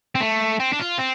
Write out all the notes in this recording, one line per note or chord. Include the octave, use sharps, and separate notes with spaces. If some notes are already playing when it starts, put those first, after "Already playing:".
C4
A3
C4
D4
F4
C4